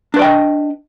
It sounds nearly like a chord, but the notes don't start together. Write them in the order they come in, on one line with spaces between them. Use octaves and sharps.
D4 B4 D5 G5 D#5